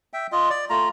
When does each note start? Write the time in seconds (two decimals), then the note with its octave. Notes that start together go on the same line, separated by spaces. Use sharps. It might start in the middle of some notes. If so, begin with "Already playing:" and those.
0.13 E5 G5
0.32 F4 D#5
0.50 D5
0.70 A3 F4 A#5